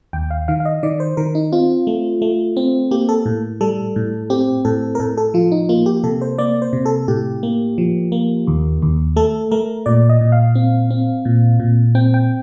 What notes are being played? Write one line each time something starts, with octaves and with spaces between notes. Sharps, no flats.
D#2 G5
F5
D#3 F5
F5
D#5
D#3 D5
C5
D#3 A#4
D#4
C4 F4
A3
A3
C4
A#3 G4
A4
A2
G3 A4
A2
C4 G4
A2 A4
A#4
A2 A4
A4
F3 F4
D#4
A#3 F4
G4
C3 A4
C5
A#3 D5
C5
C3
A4
A2 G4
A#3
F3
A#3
D#2
D#2
A3 A4
A3 A#4
A#2 D5
D#5
A#2
F5
C4
C4
A#2
A#2
C4 G5
G5